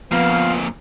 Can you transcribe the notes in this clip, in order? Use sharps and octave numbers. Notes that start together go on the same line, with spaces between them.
F2 A#2 F3 B3 F5